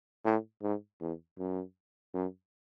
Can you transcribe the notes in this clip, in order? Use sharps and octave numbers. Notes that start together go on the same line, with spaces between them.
A2
G#2
E2
F#2
F#2